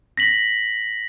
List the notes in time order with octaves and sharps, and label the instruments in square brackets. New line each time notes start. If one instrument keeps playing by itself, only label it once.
[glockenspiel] A#6 B6 F#7